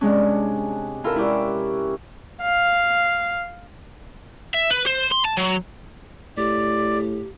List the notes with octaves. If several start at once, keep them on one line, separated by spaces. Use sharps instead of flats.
C3 G#3 C#4 D4
E4 F4 G4 A4 A#4 A#5
C#4 E4 G4 B4 D5
F5
E5
B4
C5
C6
A5
F#3
A2 G4 D5